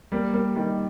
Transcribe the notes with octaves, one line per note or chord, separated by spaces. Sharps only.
G3 A#3
G3 A#3
D#3 G3